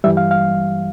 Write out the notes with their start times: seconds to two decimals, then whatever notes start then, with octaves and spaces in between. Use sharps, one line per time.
0.04 G2 E3 G3 E5
0.17 F5
0.31 F5